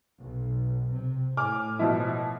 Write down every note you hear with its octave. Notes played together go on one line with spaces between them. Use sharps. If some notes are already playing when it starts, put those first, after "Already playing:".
B1
C3
A2 G#5 D6 F6
B2 F3 E4